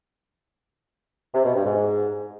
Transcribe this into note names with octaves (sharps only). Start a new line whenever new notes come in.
C3
B2
G2
G#2